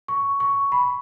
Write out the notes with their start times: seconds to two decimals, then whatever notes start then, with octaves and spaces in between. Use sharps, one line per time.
0.08 C#6
0.40 C#6
0.72 B5